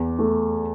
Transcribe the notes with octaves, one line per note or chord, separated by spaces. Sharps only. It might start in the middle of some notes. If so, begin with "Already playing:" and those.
Already playing: E2
A3